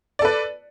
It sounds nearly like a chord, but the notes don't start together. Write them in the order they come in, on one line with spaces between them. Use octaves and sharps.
D5 A4 B4